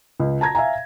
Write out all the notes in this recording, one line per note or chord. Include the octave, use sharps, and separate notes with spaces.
C#2
A5 A#5 G#6 A#6
E5 F5 G#5 A#5